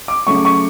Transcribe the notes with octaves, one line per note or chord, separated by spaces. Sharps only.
D6
C#3 F#3 A3 C#4 C#6
C#6